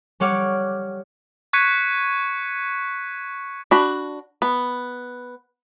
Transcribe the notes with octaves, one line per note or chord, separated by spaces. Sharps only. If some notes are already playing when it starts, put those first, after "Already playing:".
G3 G4 C#5 F#5 D6 F6
C#6 F#6 G#6 B6 C#7 D#7
D4 F#4 B5
B3